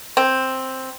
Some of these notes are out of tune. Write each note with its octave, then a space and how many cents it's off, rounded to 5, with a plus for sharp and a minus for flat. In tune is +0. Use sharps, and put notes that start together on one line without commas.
C4 +5